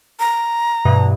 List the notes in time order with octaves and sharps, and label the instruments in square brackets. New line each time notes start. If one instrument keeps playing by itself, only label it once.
[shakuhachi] A#5
[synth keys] G2 B2 E3